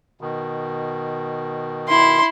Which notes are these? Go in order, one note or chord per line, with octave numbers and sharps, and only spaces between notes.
B2 D#3
E4 C6